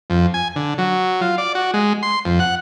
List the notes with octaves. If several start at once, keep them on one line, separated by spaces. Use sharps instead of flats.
F2
G#5
D3
F#3
F4
D5
F#4
G#3
C6
F2
F#5